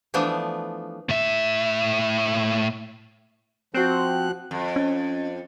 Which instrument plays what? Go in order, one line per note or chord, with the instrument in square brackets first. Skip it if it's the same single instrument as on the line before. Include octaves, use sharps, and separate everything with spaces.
[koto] E3 F3 A3 B3 D4
[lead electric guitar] A2 E5
[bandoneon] F3 F#6 [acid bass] C4 [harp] F#4 C5 G6
[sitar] F2
[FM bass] C#4